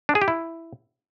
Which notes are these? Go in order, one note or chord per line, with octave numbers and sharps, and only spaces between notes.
D4
G#4
G4
E4